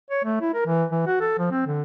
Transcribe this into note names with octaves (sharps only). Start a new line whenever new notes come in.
C#5
A3
E4
A#4
E3
E3
F#4
A4
F3
C4
D3